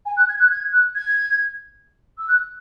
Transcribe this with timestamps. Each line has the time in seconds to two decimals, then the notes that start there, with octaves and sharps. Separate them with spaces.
0.06 G#5
0.17 F#6
0.28 G#6
0.39 F#6
0.50 G#6
0.72 F#6
0.95 G#6
2.18 E6
2.28 F#6